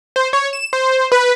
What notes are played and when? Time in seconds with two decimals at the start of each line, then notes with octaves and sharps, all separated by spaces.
0.16 C5
0.33 C#5
0.53 E7
0.73 C5
1.12 B4